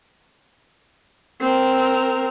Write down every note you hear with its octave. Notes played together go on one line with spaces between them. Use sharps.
C4 A#4